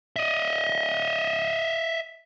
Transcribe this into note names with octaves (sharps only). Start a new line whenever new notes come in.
D#5 E5